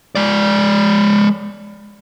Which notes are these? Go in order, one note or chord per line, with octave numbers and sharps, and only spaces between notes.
G#3 D5